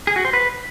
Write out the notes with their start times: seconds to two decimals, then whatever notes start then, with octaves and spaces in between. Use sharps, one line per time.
0.07 G#4
0.16 F#4
0.25 C5
0.33 B4